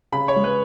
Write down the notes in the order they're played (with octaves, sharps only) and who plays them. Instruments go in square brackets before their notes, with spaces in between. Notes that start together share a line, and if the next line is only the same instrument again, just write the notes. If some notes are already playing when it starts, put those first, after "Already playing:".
[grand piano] C#3 B5
C#5
G#3
B4